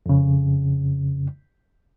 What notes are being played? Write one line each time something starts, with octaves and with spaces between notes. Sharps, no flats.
F2 C#3